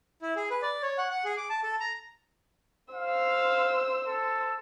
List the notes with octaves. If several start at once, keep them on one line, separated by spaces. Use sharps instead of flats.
E4
G#4
B4
D5
C#5
F#5
F#5
G#4
D6
A5
A4
A#5
C5 F5 E6
A4